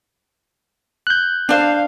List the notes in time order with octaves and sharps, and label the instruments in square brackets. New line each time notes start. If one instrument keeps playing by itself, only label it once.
[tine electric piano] F#6 G6
[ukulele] D4 C5 [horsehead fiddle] F5